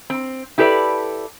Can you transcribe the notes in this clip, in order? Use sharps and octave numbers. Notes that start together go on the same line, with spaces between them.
C4
E4 G4 A4 B4 D5